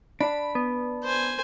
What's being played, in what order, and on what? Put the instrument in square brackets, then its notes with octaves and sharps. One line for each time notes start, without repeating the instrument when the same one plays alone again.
[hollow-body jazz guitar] D4 [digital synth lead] B5
[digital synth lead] B3
[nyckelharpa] C5 G#5